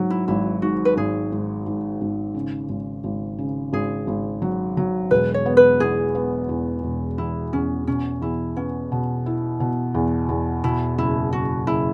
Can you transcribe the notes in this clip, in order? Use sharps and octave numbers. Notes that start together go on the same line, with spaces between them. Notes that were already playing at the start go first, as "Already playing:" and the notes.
Already playing: G#2 F#3
E4
G#1 E4
G#2 F#4
B4
G#1 G#4
G#2
G#2
G#1
C#3
G#1
G#1
C#3
G#1 G#4
G#1
F#3
F#3
E1 B4
C#5
B3
B4
E2 G#4
B3
E2
E1
E2 E4
E2 C#4
B2 C#4
E2 E4
B3 C#4
B2
E4
B2
E2
E2
B2 E4
F#1 E4
F#1 F#4
F#1 E4